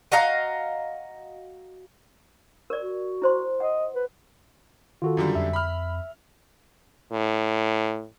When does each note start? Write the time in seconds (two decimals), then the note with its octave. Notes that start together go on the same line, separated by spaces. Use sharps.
0.12 F#4 D#5 F5 A#5
2.70 A#4 D5
2.82 F#4
3.22 E4 C5 C6
3.60 D#5 F#5
3.95 B4
5.02 D#3 F4 F#4 A4
5.17 F#2 D3 G3
5.35 F2 E5
5.53 B5 F6
7.12 A2